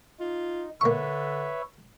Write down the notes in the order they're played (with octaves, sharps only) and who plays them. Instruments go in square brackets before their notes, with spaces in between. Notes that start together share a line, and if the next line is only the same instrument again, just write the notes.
[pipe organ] D#4 [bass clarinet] F4
[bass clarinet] D3 [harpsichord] A#3 C#6 [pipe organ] B4 C#5 E5